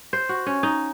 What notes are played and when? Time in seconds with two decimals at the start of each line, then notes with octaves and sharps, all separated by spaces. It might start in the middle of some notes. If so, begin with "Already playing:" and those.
0.13 C5
0.29 F#4
0.46 C#4
0.63 D#4